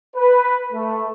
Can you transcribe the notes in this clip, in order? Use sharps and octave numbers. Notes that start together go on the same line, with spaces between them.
B4
A3